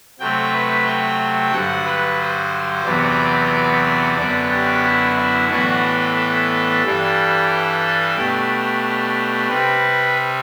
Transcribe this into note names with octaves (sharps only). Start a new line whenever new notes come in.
C3 F#3 A3 C4 G5
B4
G5
G2 D3 F#3 F#5
B4
C5
E2 C3 F#3 B3 D5
F#2 D3 F#3 B3 D4
G4
E4
E4
A2 E3 B3 D4 F#4
A4
A4
G2 E3 G3 D4
B2 A3 D4 G4
C3 G3 C4 B4